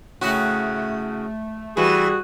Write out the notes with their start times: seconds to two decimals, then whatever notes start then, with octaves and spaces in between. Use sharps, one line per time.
0.21 A2 C#3 A3 F#4
1.77 E3 G3 F#4 G#4